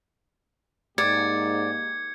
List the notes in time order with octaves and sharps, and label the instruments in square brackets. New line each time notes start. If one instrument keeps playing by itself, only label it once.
[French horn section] G#2 [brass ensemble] A#3 D#4 G4 [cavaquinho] D5 [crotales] G#6 C#7